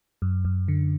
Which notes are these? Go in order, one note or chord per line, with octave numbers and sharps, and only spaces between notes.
F#2
F#2
D3